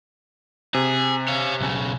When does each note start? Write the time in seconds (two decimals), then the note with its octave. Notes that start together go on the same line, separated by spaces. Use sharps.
0.74 C3 G#4
1.28 C#5 F5
1.61 B1 C#3